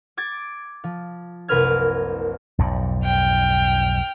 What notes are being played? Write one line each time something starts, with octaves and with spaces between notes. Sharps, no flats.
D6 G#6 A6 D7
F3
F#1 C2 A#4 B4 F6 G#6
B1 F2 G#2
G5 F6